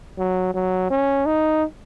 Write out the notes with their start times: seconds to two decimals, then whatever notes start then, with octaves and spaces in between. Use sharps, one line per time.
0.18 F#3
0.54 F#3
0.90 C#4
1.26 D#4